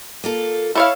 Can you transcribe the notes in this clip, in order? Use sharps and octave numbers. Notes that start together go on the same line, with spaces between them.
A#3 F4 A4
E4 A4 C#5 F5